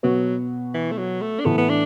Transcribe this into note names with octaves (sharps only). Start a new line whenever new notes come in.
B2 F#3 B3 F#4 B4
E3
A3
F#3
A3
D4
A2 E3 A3 B3
B3
D4